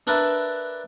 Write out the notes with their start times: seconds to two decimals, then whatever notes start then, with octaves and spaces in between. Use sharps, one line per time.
0.07 D4 A#4 B4 E5 A5